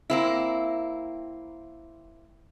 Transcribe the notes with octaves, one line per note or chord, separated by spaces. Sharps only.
A#3 C4 E4